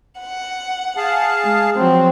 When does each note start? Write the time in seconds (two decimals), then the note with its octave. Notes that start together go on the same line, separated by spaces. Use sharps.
0.21 F#5
0.97 G#4 F5 A5
1.43 G#3
1.77 F3 F#3 C4